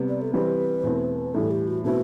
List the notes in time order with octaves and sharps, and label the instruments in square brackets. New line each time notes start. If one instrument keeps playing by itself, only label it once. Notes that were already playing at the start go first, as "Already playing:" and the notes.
Already playing: [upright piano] C3 G3 B3
[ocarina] D5
A4
[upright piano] E3 G3 C4 [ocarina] B4
[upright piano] E2 B2 A3 C4 E4
[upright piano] A2 E3 G3 [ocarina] A4
[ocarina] G4
F#4
[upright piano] B2 A3 C4 E4 B4 [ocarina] F#4